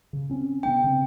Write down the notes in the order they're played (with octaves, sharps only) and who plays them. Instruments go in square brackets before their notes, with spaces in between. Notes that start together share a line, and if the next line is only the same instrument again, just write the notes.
[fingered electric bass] C#3
C4 C#4
[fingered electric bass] C3 B3 D4 [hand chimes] G5
[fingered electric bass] C#3 C4